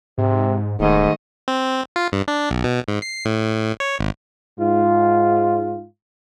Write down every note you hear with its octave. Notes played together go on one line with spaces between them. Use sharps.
G#2 C3
D#1 G#2 D#3 A3 D#5
C4
F4
G2
D4
B1
B2
G#2
C7
A2
C#5
G#1
G#2 F4